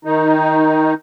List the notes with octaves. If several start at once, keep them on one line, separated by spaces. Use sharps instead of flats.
D#3 D#4